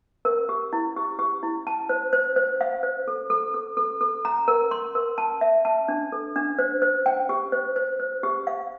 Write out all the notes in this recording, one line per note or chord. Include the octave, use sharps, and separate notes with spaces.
A#4
G4
E4
G4
G4
E4
A5
C5
C5
C5
F5
C5
A4
A4
A4
A4
A4
A#5
A#4
C6
A#4
A5
E5
A5
D4
A4
D4
C5
C5
G5
G4
C5
C5
C5
G4
F5